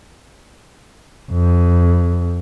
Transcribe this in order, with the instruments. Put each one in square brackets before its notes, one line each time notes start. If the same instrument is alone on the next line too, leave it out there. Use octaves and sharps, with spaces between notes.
[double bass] F2